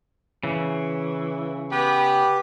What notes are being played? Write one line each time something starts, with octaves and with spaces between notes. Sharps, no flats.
C#3 E3
B3 G4 B4 G5